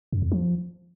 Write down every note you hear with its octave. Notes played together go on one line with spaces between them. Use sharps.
F#2
E2
F3